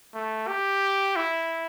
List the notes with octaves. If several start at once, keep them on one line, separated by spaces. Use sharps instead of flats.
A3
G4
E4